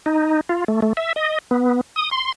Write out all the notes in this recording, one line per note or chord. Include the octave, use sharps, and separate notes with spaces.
D#4
F4
A3
A3
E5
D#5
B3
D#6
C6